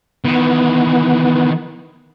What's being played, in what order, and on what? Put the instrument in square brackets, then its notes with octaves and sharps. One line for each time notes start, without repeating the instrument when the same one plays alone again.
[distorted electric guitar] D#3 E3 [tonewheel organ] B3